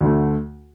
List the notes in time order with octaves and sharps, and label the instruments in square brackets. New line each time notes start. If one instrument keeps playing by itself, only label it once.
[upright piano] D2 D3 A3